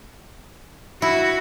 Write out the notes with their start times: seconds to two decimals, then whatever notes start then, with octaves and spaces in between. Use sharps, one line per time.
1.02 E4 F#4